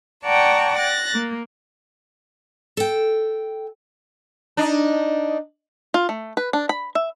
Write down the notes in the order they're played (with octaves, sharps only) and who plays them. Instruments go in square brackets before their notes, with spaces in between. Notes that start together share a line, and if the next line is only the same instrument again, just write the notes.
[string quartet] D5 F#5 G5 A5 A#5 C#6
F#6 A6 A#6
A#3
[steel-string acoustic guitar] A4 G5
[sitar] D4 D#4
[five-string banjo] F4
A3
B4
D4
B5
E5